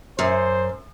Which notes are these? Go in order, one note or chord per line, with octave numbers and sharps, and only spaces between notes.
F#2 C5